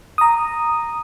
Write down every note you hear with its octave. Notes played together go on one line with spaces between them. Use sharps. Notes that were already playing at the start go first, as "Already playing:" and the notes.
A#5 D#6